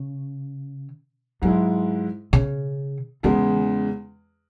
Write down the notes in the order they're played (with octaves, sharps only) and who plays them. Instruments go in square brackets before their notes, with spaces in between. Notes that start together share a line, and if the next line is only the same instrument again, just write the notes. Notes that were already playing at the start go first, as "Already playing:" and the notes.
Already playing: [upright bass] C#3
[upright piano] G#2 G#3 E4 [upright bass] F#3
[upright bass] C#3
[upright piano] E2 C#3 G#3 [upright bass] E3